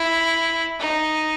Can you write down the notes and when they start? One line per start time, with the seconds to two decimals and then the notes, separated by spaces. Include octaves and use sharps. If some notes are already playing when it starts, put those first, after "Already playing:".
Already playing: E4
0.79 D#4